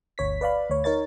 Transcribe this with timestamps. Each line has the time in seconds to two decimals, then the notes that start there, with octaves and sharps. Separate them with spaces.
0.18 G1 D2 C#5 B6
0.41 B4 D5 F5 B5
0.70 D2 C#5
0.84 D#4 A#4 C#5 A6